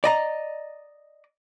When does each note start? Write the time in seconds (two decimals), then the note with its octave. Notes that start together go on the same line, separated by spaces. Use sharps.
0.04 D5 D#5 A#5